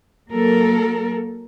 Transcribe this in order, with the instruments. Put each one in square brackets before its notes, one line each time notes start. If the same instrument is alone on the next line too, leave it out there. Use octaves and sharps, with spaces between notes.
[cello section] F#3 A#3 A4 A#4